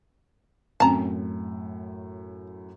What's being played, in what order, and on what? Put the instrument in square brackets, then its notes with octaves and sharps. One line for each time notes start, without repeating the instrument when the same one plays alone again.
[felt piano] F#2 A2 [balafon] C4 C#4 [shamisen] A5 A#5